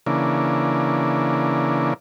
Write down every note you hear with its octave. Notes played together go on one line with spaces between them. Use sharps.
C#3 E3 A#3 D4